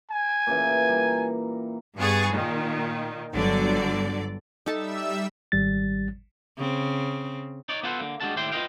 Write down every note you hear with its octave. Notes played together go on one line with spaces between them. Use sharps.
G#5
A#2 C#3 E3
G3 A#4
G2 B3 G#4 G#5 C#6 A6
A#2 D#3
G1 D3 F#3 D5
G3 D#4 A4 E5 A5 E6
G#1 G3 A6
C#3 C4
D#4 C#5 D5
B3 E4 F4 A4 B4 C5
D3 A#3
G3 G#3 D4 F#4 A#4 A5
D#2 A2 G3 E4 G5 C6
F4 B4 C5 D#5 F5 G5